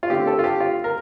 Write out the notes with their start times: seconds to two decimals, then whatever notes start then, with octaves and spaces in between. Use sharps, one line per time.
0.03 F4
0.10 D3 A3 C4 G4
0.27 A4
0.39 F4
0.44 G4
0.60 F4
0.84 A#4